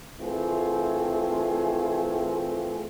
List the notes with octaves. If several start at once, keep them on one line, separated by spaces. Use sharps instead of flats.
E3 A3 C4 F4 G#4